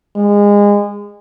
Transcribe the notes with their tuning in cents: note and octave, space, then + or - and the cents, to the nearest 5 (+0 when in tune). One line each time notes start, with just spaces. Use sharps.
G#3 -25